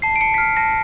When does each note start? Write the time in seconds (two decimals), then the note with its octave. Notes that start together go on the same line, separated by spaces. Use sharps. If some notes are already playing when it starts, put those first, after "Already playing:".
0.02 A5 C7
0.16 D7
0.21 A5 C#7
0.34 B6
0.38 F6 C7
0.57 A5 A#6